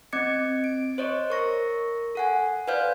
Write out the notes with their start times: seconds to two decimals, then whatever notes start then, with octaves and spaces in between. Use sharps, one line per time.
0.13 C4 D#5 D6 G#6 C#7
0.64 D7
0.98 C5 C#5 D#5 C#6
1.30 A#4 C#6 A#6
2.15 A4 F#5 G#5
2.68 B4 C5 D5 F5 F6 G6